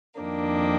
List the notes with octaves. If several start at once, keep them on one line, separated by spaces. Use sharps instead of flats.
F2 D#3 A#3 D4